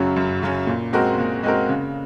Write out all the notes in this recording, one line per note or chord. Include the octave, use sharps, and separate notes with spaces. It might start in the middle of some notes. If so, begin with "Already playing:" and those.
Already playing: F#2 C#3 F#3 C#4
F#2
C#3 F#3 C#4
A#2
G#3 C4 F#4 A#4
A#2
G#3 C4 F#4 A#4
C#3